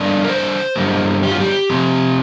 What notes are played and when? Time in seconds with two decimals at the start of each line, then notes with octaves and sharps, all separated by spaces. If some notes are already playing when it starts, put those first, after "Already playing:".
Already playing: D3 G3 A#3 D4 D5
0.25 A#4
0.29 C5
0.76 G2 D3 G3 A#3
1.23 G4
1.31 F4
1.40 G4
1.70 C3 F3 C4